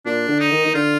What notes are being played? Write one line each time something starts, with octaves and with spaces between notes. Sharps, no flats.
A#2 D4
D3
D#4
D#3
D#3
D3 F4